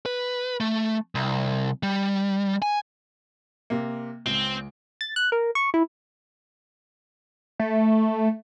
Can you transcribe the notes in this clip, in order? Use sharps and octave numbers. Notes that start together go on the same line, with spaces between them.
B4
A3
C2
G3
G#5
C3 A#3
C#2 C4
A6
F#6
A#4
C#6
E4
A3